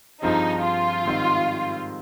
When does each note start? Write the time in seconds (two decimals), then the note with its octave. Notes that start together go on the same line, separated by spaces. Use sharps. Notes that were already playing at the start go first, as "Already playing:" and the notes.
0.22 G2 F3 C4 D#4 F4 G#4
0.64 F4
1.05 G#2 D#3 G3 C4 D#4